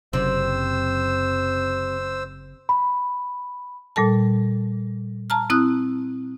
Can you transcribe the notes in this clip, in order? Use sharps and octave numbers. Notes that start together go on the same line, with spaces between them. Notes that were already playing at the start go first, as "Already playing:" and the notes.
F#1 F#2 C3 C5 E6
B5
A#2 G3 A4 A5
A5 A#5 F6
C4 E4 D#6 F#6